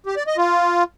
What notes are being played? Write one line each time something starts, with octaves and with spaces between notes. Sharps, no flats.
G4
D5
D#5
F4